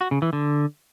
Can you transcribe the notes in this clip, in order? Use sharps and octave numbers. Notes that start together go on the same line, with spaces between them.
F#4
C#3
E3
D3